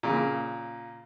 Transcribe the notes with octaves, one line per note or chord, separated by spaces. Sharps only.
A#2 C#3